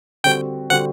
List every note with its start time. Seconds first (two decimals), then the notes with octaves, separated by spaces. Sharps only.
0.24 D3 G3 C4 F#4 C5 G5
0.70 D3 G3 C4 F#4 C5 F#5